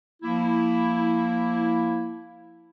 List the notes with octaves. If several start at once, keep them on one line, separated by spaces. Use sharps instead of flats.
F3 A#3 E4